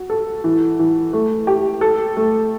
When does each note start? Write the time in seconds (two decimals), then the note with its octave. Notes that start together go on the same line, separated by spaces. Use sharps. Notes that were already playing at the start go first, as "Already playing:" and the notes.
Already playing: F#4
0.10 A4
0.44 E3
0.79 E3
1.13 A3
1.47 G4
1.81 A4
2.17 A3